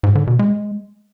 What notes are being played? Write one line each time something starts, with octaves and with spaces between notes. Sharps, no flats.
G#2
D3
B2
G#3